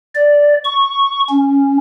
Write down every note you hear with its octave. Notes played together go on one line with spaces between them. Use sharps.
D5
C#6
C#4